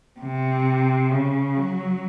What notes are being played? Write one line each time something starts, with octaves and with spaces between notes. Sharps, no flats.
C3
C#3
F#3